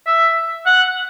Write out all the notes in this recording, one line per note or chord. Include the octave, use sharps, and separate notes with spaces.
E5
F#5